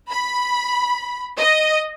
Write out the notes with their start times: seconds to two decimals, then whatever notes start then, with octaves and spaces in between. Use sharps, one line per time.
0.10 B5
1.38 D#5